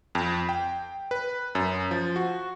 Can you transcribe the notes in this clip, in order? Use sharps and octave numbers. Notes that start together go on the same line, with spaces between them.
F2
G5
B4
F#2
F3
F#4